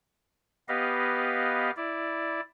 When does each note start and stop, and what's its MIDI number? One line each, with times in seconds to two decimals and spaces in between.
0.68 1.71 59
0.68 1.71 67
0.68 1.71 71
0.68 1.71 75
0.68 1.71 77
1.77 2.40 64
1.77 2.40 74